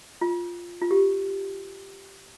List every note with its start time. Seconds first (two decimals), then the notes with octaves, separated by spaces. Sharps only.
0.21 F4
0.82 F4
0.91 G4